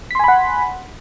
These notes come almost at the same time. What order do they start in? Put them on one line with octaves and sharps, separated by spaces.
B6 C6 G#5 B5 F#5